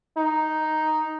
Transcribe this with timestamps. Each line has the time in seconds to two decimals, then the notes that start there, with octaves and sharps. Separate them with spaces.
0.17 D#4